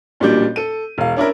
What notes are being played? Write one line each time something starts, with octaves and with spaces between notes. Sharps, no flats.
A1 A#2 F#3 G3 D4 G6
A4 D#7
E1 F5
C#4 D4 E4 A#4